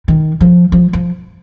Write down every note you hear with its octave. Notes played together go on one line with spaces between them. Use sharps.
D#3
F3
F3
F3